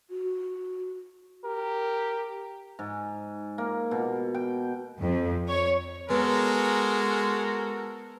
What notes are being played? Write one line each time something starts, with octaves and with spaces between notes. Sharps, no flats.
F#4
G4 A#4
G#2
A#3
B2
G5
F2
C#5
G#3 B3 F#4 A4 A#4